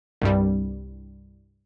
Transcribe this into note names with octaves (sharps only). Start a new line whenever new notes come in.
C2 G2 G3